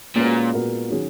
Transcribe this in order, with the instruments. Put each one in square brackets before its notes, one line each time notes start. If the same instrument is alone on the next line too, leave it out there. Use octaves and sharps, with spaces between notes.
[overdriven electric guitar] A#2 [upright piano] G#3 C#4 F#4 B4
[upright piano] A#2 G#3 B3 F#4 A#4
D#3 F#3 C#4 G#4